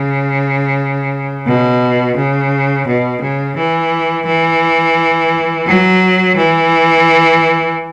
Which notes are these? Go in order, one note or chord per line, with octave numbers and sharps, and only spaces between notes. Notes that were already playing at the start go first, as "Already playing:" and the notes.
Already playing: C#3
B2
C#3
B2
C#3
E3
E3
F#3
E3